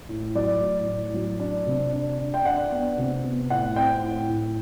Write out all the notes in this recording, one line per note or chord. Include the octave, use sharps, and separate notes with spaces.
A2
F#3 D5
A2
A2
F#3
D4
C3
D4
D4
G5
D4 F#5
B3
C3
B3
A2 F#5
C4 G5
A2
A2